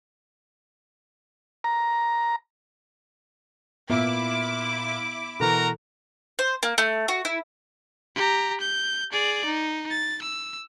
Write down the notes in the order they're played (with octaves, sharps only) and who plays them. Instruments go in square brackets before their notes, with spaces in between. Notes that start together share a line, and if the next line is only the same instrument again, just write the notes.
[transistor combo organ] A#5
[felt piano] A#2 [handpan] B3 E5 [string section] E4 D6
[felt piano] B2 E3 [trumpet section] F#4 A#4 A#5 [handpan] A4
[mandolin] C5
A#3
A3
F#4
E4
[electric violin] G4 A#5
G6
G#4 D5
D#4
A6
E6